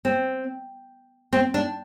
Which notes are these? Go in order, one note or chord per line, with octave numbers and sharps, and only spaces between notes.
C4
C4
D4